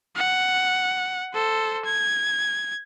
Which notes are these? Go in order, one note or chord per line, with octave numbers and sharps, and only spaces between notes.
F#5
A4 C5
G#6